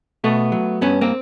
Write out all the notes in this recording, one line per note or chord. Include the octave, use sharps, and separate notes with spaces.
B2 A3 B3
F#3
G2 B3 C#4
A#3 C4